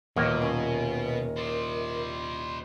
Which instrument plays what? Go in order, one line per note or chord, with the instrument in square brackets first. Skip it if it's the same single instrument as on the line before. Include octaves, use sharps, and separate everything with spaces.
[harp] D#1 [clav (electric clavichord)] D#2 A#3 [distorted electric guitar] B2
[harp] C#4 [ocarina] A#4
[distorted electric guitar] C5 D5